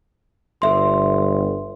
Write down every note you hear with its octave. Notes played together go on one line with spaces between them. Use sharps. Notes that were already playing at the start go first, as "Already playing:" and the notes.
G1 A4 E5 C6